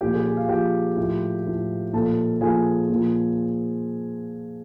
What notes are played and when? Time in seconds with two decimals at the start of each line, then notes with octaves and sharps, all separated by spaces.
0.01 A#2 F3 G4 G5
0.13 G#4 G#5
0.25 G#4 G#5
0.37 F4 F5
0.49 A#2 F3 G4 G5
0.97 A2 F3
1.45 A2 F3
1.93 A#2 F3 A4 A5
2.41 A#2 F3 G#4 G#5
2.90 A#2 F3